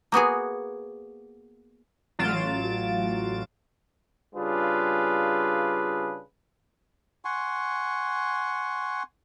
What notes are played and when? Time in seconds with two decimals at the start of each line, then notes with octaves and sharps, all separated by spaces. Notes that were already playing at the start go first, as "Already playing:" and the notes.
0.12 A#3 B3 F#4 G#4
2.19 A1 F#3 F4 A6 D7 E7
4.35 C#3 G3 D4 F4 G#4 B4
7.25 F#5 G#5 C6 C#6